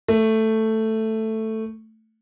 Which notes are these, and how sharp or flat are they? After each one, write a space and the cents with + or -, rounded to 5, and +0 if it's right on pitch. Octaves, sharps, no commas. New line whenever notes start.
A3 +5